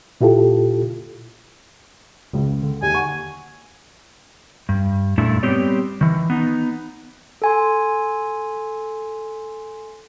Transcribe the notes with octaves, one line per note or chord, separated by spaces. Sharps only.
A#2 E4 F4 G4 A4
C#2 C#3
D3
D#2 G#5
F#5 C#6
G2
G2 A#2 A3 D4 E4
G3 B3 C4 G4 C#5 D5
D#3 E3
B3 D#4
A4 G#5 C6